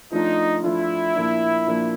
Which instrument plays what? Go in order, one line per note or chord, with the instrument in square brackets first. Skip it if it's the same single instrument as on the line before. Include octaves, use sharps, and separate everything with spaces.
[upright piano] F3 A3 D4 F4 [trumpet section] D#4
[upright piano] F3 A3 D4 F4 [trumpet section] E4
[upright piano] A#2 F3 A#3 D4
A#2 F3 A#3 D4